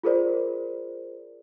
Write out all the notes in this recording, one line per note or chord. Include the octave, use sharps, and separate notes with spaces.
F4 G#4 A#4 C5 D5